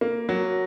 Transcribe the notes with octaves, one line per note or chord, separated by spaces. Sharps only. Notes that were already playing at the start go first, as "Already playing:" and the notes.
A#3
F#3